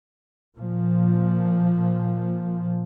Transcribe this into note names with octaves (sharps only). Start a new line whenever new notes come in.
A#2 F3